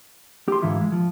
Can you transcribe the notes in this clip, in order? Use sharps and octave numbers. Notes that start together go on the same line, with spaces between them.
G4 C6
G#2 D3 E3 E4 F4
G#3
F3